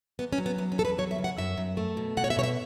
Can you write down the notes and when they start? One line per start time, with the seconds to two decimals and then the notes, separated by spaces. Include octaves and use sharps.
0.19 E2 B3
0.33 C#4
0.38 F#3
0.46 B3
0.58 E2 B3
0.72 C#4
0.78 E2 A4
0.85 B4
0.98 F#3 C#5
1.11 E5
1.18 C#3
1.24 F#5
1.37 F#2 E5
1.57 F#2
1.77 A3
1.97 B2
2.17 B2 F#5
2.24 C#5
2.30 E5
2.37 B2 C#5
2.43 E5